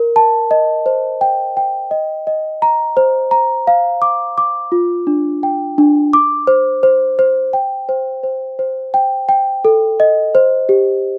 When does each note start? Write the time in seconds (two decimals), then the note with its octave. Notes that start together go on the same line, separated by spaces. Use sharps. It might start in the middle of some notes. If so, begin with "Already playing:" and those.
Already playing: A#4
0.16 A5
0.51 D#5
0.86 C5
1.21 G5
1.57 G5
1.91 D#5
2.27 D#5
2.62 A#5
2.97 C5
3.31 A#5
3.67 F5
4.02 D6
4.38 D6
4.72 F4
5.07 D4
5.43 G5
5.78 D4
6.13 D6
6.47 C5
6.83 C5
7.19 C5
7.53 G5
7.89 C5
8.23 C5
8.59 C5
8.94 G5
9.29 G5
9.65 A4
10.00 D#5
10.35 C5
10.69 G4